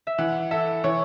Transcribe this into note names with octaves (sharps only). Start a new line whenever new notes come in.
E5
E3 F#5
A4 E5
E3 C#5